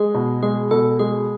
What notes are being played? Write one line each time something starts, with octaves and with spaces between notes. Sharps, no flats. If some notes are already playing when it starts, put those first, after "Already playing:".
Already playing: G#3 G#4
B2
G#3 G#4
B2 A4
G#3 G#4